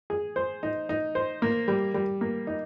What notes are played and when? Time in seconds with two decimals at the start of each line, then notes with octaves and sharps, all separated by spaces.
0.10 G#4
0.36 C5
0.63 D#4
0.89 D#4
1.15 C5
1.42 A#3
1.68 G3
1.94 G3
2.21 A#3
2.47 D#4